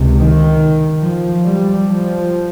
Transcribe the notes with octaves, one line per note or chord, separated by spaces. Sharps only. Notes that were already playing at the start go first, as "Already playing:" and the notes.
Already playing: C#2 C3
D#3
F3
G3
F3